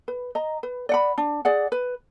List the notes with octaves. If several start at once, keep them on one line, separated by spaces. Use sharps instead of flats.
B4
D#5 A#5
B4
D5 F#5 B5
D4
G#4 D5 F#5
B4